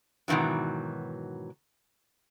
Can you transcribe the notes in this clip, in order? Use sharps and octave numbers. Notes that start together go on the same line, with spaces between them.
G#2 B2 D#3 E3 F#3